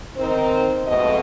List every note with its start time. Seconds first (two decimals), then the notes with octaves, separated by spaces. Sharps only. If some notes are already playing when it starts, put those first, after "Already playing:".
0.17 D#3 C4 D#4 A#4 C5
0.87 F2 G#2 B2 A3 D#5